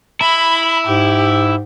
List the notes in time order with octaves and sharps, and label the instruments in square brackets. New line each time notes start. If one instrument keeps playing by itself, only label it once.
[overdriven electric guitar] E4 [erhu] B5
[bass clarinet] G#2 [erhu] G4